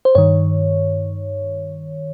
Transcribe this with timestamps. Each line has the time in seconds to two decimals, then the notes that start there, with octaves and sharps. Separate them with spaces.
0.05 C5
0.15 G2 D#3 C#5